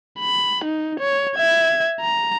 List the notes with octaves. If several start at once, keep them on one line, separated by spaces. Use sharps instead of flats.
B5
D#4
C#5
E5 G#6
A#5